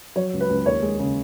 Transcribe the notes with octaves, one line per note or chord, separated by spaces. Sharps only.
F#3 C#5
C#2
B4
C#2
D#2 C#5
G#3
C#3